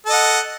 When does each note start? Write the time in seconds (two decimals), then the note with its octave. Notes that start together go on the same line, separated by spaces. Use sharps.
0.06 A4
0.09 D#5
0.13 F#5